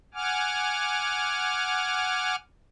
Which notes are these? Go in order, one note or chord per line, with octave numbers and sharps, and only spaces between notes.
F#5 G#5 D6 F6